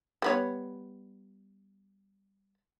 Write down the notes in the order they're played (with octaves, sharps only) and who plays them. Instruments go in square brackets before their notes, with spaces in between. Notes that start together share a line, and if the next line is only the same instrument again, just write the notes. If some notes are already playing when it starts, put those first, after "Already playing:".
[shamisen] G3 B3 C#5